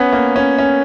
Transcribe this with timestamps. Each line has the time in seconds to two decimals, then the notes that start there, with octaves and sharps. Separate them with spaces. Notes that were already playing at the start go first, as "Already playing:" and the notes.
Already playing: B3 C#4
0.12 A#3
0.36 C#4
0.59 C#4